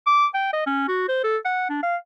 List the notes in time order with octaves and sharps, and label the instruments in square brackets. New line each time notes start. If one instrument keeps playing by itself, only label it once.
[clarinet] D6
G5
D#5
C#4
F#4
C5
A4
F#5
D4
F5